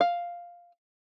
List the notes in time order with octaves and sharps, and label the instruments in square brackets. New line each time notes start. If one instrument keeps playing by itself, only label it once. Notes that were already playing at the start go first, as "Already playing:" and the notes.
[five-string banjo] F5